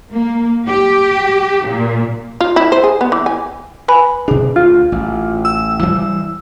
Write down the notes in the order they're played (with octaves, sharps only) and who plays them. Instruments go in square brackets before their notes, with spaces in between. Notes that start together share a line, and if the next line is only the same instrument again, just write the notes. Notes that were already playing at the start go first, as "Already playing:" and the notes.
[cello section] A#3
G4
A#2
[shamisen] F4
E4
C5
G#4
B3
E3
G#5
[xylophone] B4 G#5 B5
[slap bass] B2 D4 [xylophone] G#4
[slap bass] D2 [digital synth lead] F4
[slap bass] A1
[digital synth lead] E6
[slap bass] G2 E3 G3